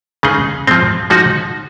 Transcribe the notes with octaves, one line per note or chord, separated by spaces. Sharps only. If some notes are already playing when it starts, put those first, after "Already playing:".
C#3 G#3 D#4 G#4 D#5
F3 G#3 C4
F3 G#3 D#4 F#4